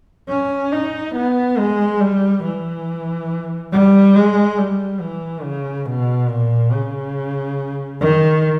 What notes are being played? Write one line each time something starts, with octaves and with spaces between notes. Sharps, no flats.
C#4
D#4
B3
G#3
G3
E3
G3
G#3
G3
E3
C#3
B2
A#2
C#3
D#3